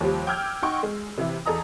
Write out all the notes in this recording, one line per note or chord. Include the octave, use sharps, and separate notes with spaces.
D#2 F3 G3 G4
G5 D6 E6 F6 G6 G#6
D#4 D#5 F#5 G5 C6 C#6
G#3
C3 E3 E4
E2 G#4 A4 D#5 A#5 D#6